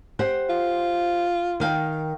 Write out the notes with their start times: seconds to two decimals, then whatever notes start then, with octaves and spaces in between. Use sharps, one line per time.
0.19 G4 C5 F#5
0.50 F4
1.60 D#3 F5 G5